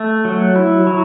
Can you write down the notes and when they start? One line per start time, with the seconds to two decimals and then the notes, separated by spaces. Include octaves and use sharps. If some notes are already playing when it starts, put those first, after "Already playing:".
Already playing: A3
0.25 F#3
0.56 E4
0.87 F#3